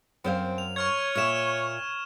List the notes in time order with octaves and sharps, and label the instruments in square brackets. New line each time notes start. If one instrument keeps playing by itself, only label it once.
[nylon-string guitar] F#2 C5 F5 [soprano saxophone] C4
[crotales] F7
[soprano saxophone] C#5 [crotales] C#6 F6 G#6
[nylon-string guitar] A#2 E5 [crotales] F6 E7